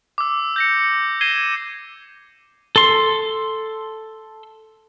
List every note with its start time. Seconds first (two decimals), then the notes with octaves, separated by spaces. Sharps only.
0.18 D6 E6
0.56 G6 A#6 C#7
1.21 G#6 A#6 C7 D#7 E7 G7
2.76 A4 C6